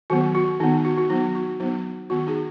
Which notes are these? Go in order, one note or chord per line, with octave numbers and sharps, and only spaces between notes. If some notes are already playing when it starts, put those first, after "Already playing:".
D#3 F#3 B3 F#4
F#4
D#3 B3 D#4
D#4
F#4
F#4
F#3 B3 D#4
F#4
F#3 B3 D#4
D#3 B3 F#4
D#4 G#4